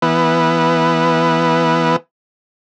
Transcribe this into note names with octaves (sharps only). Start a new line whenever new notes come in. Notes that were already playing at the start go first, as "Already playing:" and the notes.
E3 B3